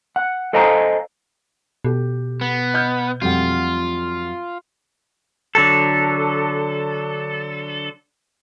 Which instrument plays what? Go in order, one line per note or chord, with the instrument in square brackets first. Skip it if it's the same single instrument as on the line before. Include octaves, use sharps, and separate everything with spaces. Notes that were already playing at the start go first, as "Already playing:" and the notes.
[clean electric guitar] F#5
A4 C5 D#5 F5 G#5 A#5
[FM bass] B2 [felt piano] G4 A4
[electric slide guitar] B3
[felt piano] D#5 F6 G6
[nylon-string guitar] F2 F#5 [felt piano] F#3 G3 A3 [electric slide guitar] F4
[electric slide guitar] D3 F#3 A4